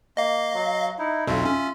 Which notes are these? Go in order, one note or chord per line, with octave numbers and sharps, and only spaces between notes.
A#3 D#5 F5
F#3
D#4 E4
B1 F2 B2 F4 E5
C#4